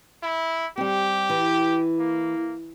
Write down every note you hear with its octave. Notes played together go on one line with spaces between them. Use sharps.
E4
G3 C4 G4
E3
A#3